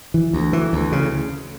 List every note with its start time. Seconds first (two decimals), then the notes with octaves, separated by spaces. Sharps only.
0.14 E3
0.33 D2
0.53 E3
0.73 D2
0.92 C#3